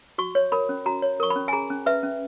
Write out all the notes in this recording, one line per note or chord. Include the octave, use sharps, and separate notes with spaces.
F#4 C#6
C#5
A#4 B5
C#4
F#4 A#5
C#5
A#4 C#6
B5
C#4
G#5
G#4 A#5
C#4
B4 E5
C#4